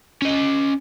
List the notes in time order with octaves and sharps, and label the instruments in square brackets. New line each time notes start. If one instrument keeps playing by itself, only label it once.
[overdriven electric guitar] C#4 D#5